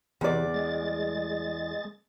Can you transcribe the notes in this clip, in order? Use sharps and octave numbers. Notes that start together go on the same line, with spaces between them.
E2 C3 E3 D5
G#3 A6